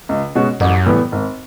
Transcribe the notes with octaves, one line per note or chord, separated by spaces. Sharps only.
C#2
B2 G#3 C#4 F#4
A1 F#2
A2 E3 G3 B3
G#1